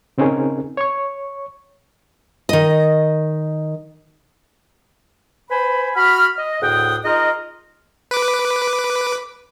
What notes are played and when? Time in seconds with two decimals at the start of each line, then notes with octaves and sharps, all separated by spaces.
0.18 C#3 C4 C#4 D#4 G#4 A#4
0.77 C#5 C#6
2.49 D#3 D#5
5.50 B4 C5 G#5 B5
5.96 F#4 B5 F6
6.37 D#5
6.61 D2 A2 G#4 F#5 G5 D#6
7.04 D#4 F4 G#4 A#4 D#5
8.11 B4 D6